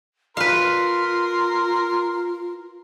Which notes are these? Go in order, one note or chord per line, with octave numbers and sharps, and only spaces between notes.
F4 A#4 B4 F5 C6